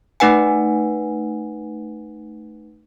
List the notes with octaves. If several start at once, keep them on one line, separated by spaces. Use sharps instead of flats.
A3 D#4 B4 F#5 G#5